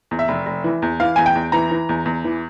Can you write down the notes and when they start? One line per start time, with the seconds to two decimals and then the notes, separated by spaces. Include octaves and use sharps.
0.11 E2
0.19 E5
0.28 F1
0.46 F1
0.64 E3
0.82 E2
1.00 E3 F5
1.16 E2 G#5
1.26 G5
1.35 E2
1.52 E3 A#5
1.71 E3
1.89 E2
2.06 E2
2.24 E3